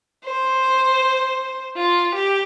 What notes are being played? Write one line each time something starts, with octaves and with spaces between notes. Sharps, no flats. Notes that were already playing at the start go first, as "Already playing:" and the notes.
C5
F4
G4